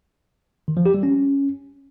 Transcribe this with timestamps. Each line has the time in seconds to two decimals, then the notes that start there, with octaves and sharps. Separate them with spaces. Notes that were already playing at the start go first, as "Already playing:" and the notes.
0.68 D#3
0.77 F3
0.86 G4
0.94 G3
1.03 C#4